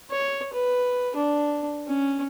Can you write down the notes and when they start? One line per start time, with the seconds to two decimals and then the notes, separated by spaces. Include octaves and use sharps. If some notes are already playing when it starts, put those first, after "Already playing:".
0.10 C#5
0.53 B4
1.16 D4
1.87 C#4